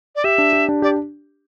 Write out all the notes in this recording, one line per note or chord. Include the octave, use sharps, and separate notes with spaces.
D5
G4 E5
D4
G4
D4
G4 D5